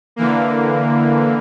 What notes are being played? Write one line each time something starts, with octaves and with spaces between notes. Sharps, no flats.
D3 E3 A#3